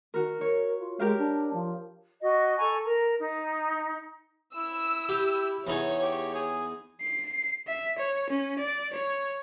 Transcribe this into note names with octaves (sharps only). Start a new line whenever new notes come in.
D#3 F#4 A#4
A#4 C#5
F4
G#3 G4 A#4 F5
D4
F3
F#4 D#5
A4 G#5 A#5 C#6
A#4 A#5
D#4
E4 E6
G4
E2 D#4 C#5 G#5
G4
G#4
C7
E5
C#5
C#4
D5
C#5